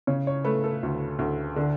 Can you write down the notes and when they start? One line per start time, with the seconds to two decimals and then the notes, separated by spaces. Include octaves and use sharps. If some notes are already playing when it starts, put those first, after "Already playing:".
0.07 C#3 C#5
0.27 C#5
0.45 A3 B4
0.64 A4
0.83 D2
1.19 D2
1.56 D3